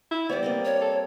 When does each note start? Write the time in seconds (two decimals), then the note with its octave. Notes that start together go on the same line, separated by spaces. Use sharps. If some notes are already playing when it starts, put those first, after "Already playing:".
0.11 E4
0.29 G3 B3 C5 D5
0.43 A#3 C4 D#5
0.65 C#5
0.81 A4